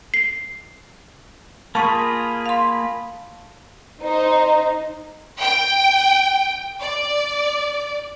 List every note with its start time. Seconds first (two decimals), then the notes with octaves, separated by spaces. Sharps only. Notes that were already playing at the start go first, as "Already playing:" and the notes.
0.14 C7
1.75 A#3 F4 G#4 A5 B5 C#6
2.46 F5 C6
4.01 D#4 C5
5.40 G5
6.80 D5